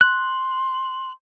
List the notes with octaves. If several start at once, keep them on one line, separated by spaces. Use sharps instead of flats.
C6 F#6